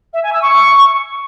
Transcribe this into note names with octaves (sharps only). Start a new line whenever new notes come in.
E5
G#5
E6
C#6